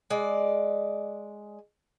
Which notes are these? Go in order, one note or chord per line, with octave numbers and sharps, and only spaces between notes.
G#3 D5